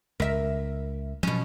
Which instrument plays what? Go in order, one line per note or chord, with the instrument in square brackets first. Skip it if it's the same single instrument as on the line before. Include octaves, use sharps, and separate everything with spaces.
[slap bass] C#2 [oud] A#4 E5
[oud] B2 C#4 [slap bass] F3 F#3